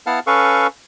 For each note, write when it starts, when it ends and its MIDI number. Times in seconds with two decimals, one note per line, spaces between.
0.07 0.19 59
0.07 0.19 64
0.07 0.19 77
0.07 0.19 78
0.07 0.19 81
0.07 0.19 89
0.27 0.67 61
0.27 0.67 69
0.27 0.67 71
0.27 0.67 77
0.27 0.67 85